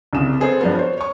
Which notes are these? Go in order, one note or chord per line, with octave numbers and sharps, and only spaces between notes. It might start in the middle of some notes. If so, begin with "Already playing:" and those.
C2 C#3 E7
B3 C4 G#4 A4 C5
G2 F3 B3
C5 C#5
C#5 C#6